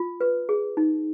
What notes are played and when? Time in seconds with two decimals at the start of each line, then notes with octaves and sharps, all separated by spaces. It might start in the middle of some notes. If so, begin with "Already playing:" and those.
Already playing: F4
0.21 B4
0.49 G#4
0.77 D#4